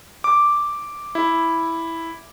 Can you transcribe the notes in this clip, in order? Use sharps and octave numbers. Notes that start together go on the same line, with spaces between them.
D6
E4